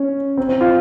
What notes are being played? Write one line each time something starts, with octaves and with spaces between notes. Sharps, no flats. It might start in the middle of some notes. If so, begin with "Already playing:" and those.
Already playing: C#4
C4
C4
F4